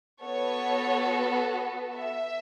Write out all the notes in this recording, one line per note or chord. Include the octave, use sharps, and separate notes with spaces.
B3 F#4 A4 C#5
E5